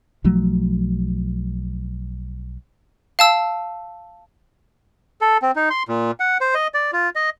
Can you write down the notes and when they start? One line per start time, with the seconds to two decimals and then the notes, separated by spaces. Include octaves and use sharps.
0.24 B1 F3 F#3 A3
3.19 F5 A5 E6
5.21 A4
5.42 C4
5.56 D#4
5.70 C6
5.89 A#2
6.20 F#5
6.41 C5
6.55 D#5
6.74 D5
6.93 F4
7.16 D#5